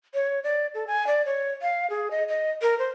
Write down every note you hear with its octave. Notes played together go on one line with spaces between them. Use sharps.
C#5
D5
A4
G#5
D5
C#5
F5
G#4
D#5
D#5
A#4
C5